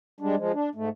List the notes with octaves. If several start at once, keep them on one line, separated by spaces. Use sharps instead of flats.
G3 G#3 D4
F3 G#3
D4
G#2 A3